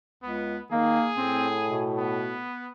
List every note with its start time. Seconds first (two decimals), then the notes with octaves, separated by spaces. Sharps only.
0.23 C#2 B3
0.71 D#3 A#3 G#4
1.17 A2 C4
1.68 B2
1.98 B3